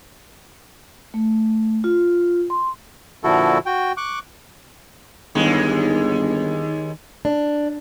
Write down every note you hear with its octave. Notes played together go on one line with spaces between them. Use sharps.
A3
F4
C6
A#2 D3 F3 E4 F#4 A4
F#4 G5
C#6 D6 F#6
G1 D#2 G#3
D4